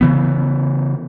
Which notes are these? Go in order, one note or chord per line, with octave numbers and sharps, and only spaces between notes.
C#3 E3 B3